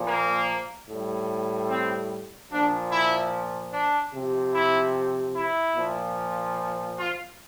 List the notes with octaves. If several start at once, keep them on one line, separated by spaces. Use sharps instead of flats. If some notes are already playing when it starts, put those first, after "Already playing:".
Already playing: A#2 F3
A#3
A2 G3
C4
A#2 F3 D4
E4
D4
C3 F3
E4
E4
A#2 F3
F4